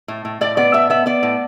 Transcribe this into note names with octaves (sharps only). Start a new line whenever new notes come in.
A2
A2
A2 D5
B3 D5
A2 E5
B3 E5
B3 D5
A2